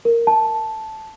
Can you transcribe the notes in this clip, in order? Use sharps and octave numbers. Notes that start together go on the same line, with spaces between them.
A#4
A5